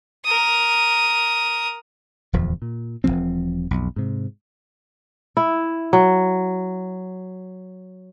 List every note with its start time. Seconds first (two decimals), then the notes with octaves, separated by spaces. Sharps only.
0.25 A#4 D#6
2.33 D1 E2 F3
2.62 A#2
3.04 E1 E2 F3 C4
3.71 B1 F2
3.96 G#2 C3
5.37 E4
5.93 F#3